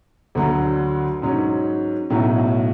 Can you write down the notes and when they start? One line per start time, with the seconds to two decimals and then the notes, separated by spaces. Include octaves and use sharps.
0.35 D2 D3 F#3
1.22 G#2 F#3 C#4
2.10 B1 A2 F#3 C#4